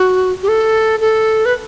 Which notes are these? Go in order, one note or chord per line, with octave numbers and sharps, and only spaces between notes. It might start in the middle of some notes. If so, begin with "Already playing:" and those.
Already playing: F#4
G4
A4
A4
B4